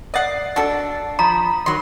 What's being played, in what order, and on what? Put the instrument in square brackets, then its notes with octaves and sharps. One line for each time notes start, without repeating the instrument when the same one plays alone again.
[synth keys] D5 A6 C7 [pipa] D#5 F#5
[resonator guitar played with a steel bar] D4 [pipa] F#4 A4
[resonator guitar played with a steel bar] F3 [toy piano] A#5 [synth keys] B5 D#6
[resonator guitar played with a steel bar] D#3 F#3 [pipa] C6